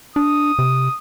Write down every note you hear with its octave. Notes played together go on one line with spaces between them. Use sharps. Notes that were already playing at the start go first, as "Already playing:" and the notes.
D4 D#6
C3